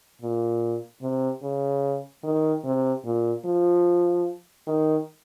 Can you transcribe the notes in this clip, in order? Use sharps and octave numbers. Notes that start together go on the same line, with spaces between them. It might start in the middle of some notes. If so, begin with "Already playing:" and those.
A#2
C3
C#3
D#3
C3
A#2
F3
D#3